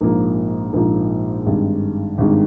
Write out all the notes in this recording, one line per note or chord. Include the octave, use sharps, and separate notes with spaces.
A#1 G#2 F3 A#3 D#4
A#1 G#2 F3 A#3 D#4
G#1 G2 D#3 G#3
G#1 G2 D#3 G#3